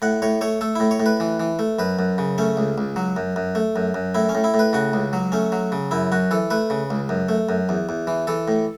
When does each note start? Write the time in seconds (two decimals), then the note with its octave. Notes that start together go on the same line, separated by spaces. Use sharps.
0.02 A2 F#5
0.22 A2 C#5
0.41 A3 C#5
0.61 A3 A4
0.75 A2 E4
0.91 C#5
1.00 A2
1.06 B4
1.20 E3
1.40 E3
1.59 A3
1.79 F#2 B4
1.99 F#2
2.18 C#3
2.38 A3 C#4
2.57 C#2
2.78 C#2
2.96 F#3
3.17 F#2
3.36 F#2
3.55 A3
3.76 F#2
3.94 F#2
4.15 A2 E4
4.29 C#4
4.35 A2
4.44 E4
4.54 A2
4.59 B4
4.73 C#3 F#4
4.93 C#2
5.13 F#3
5.32 A3 C#4
5.52 F#3
5.72 C#3
5.91 F#2 E4
6.12 F#2 F#4
6.31 E3 A4
6.50 A3 B4
6.70 C#3
6.90 C#2
7.09 F#2
7.29 A3
7.49 F#2
7.69 E2
7.89 E2
8.07 E3
8.27 E3 A4
8.48 A2